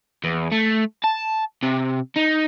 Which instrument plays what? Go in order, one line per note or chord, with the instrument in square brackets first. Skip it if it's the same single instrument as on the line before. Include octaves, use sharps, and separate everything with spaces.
[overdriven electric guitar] E2
A3
A5
C3
D#4